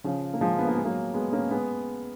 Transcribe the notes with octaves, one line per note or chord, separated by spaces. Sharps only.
C#3 F3
A#3
F3 G#3
B3
A#3
G#3
F#3 A#3
G#3 B3
A#3 C#4
G#3 B3